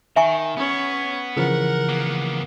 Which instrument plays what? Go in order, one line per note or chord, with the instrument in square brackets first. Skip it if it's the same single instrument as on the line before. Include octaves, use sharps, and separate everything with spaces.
[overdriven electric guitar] D#3 [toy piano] E5 G#5 C#6
[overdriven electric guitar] B3 [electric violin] C#4 C#5
[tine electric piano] C#3 E3 F3 [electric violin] A#4 F#5
[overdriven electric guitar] A#3 B3